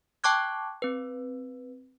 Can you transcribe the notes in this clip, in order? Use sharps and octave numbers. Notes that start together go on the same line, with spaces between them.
G5 A5 C#6 D6 F#6 G#6
C4 B4